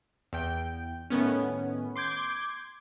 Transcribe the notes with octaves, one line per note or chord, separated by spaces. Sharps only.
E2 G5
A2 D#3 B3 C#4
C6 D6 G6 G#6